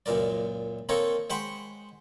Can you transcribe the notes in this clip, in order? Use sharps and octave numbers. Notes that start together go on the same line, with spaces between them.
C#2 F#2 A#2 A#4 D5
A#3 C4 D#4 A4 A#4 C#5
G#3 C5 F#5 G5 B5 C#6